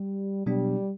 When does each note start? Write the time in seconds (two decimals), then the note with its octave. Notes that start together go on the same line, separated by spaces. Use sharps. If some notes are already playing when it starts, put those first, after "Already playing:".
Already playing: G3
0.46 B2 F#3 G3 B3 D4